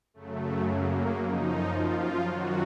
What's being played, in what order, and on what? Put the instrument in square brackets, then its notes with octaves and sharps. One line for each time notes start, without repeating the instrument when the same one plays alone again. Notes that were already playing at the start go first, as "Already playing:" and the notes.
[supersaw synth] F#2 C#3 F#3 A3
A#3
F#2 F3 D#4
F4
F#2 D#3 F#3 F#4